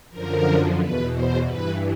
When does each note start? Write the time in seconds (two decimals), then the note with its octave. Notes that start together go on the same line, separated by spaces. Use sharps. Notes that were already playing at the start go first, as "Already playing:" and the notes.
0.10 F#2 D3 F3 A#4
0.79 E2 B2 B4
1.12 C5
1.45 G2 E3 B4